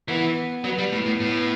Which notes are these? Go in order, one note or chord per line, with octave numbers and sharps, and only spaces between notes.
E3 B3
F#3 B3
G3
A2
A2
A2